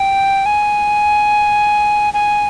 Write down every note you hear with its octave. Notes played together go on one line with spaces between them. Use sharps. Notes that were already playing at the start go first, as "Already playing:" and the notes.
Already playing: G5
G#5
G#5